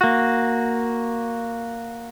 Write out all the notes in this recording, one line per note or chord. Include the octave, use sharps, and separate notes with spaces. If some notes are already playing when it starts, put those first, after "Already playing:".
A#3 F#4